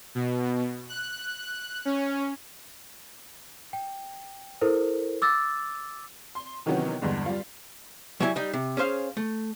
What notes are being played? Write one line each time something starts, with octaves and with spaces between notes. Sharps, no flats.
B2
F#6
C#4
G5
E4 A4 A#4 C5
D6 E6 A6
C6
C3 D#3 E3 F#3 B3 C#4
E2 G2 D3 G#3
G3 F4
F#3 G3 E4 G#5
G3 D#4
C3
C#4 G#4 C5 F5
A3